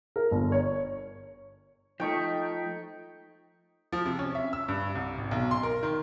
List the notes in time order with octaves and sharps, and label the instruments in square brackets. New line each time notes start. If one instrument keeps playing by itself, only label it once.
[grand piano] A#4
G1
C#5
[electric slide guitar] F3 A3 [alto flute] D#4 [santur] G5 C#6
[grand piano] F3
C3
C#4
E5
E6
G2
C2
G#1
B1
C6
A#4
D#3